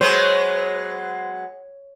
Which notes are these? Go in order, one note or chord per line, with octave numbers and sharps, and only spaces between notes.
F#3 G#3 B3 C5 C#5